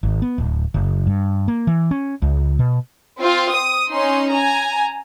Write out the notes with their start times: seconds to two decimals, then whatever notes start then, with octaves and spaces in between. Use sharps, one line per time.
0.03 G#1
0.22 B3
0.38 D1
0.74 F#1
1.07 G2
1.48 A#3
1.67 E3
1.91 C#4
2.22 C#2
2.59 B2
3.19 C4 F4
3.51 D#6
3.91 C#4 D#4 C6
4.30 G#5 A#5